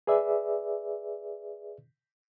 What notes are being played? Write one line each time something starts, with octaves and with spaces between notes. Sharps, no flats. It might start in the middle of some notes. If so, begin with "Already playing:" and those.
G#4 B4 D5 E5